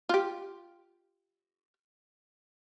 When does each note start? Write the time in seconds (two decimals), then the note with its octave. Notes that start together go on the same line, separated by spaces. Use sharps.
0.09 F4 G4